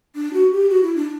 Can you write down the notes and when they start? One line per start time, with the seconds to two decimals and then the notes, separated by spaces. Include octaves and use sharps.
0.16 D4
0.33 F#4
0.51 G4
0.70 F#4
0.83 E4
0.96 D4